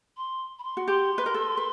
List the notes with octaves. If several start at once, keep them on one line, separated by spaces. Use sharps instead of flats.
C6
B5
C6
F#4
G4 C6
B4
A#4
A4
B4